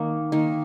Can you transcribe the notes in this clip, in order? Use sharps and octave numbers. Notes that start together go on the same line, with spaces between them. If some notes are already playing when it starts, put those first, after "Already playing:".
Already playing: D#3 A#3
D#3 A#3